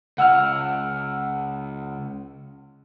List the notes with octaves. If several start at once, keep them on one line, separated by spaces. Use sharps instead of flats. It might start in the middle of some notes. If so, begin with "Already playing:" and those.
C#2 F#5 E6 F6